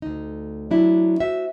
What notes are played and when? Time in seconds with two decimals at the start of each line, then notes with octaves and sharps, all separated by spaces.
0.02 D2 D#4
0.71 F#3 D4 E4
1.20 F#4 C5 E5